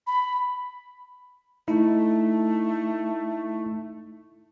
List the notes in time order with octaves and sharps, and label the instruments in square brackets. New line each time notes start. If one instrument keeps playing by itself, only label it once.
[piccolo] B5
[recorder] A3 [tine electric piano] D#4 E4